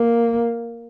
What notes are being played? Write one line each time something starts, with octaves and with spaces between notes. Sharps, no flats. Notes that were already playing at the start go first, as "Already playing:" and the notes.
Already playing: A#3